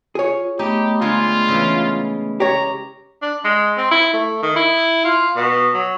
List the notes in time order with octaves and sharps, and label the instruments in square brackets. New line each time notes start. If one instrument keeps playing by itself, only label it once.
[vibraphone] F4 [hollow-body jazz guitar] G#4 C#5
[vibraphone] A3 B3 B5 [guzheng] D#4 [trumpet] G4
[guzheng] D3 G3 G#3 [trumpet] F4
[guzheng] C#3 E3
[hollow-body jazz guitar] G4 C#5 [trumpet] A#5
[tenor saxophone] D4
G#3
C4
E4
A3
D#3
E4
F4
B2
F#3